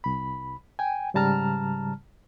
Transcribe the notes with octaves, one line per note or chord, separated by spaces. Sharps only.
C2 B5
G5 G#5
G#2 C#3 G3 A5 A#5 F6